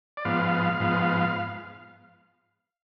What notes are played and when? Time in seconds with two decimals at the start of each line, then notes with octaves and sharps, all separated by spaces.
0.17 D5
0.25 G#2 F3 B3 F5
0.80 G#2 F3 B3